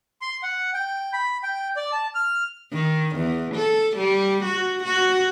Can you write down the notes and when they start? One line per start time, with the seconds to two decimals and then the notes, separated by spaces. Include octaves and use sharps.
0.22 C6
0.43 F#5
0.74 G5
1.13 B5
1.43 G5
1.76 D5
1.92 A5
2.15 F6
2.72 D#3
3.17 E2
3.55 A4
3.97 G3
4.44 F#4
4.84 F#4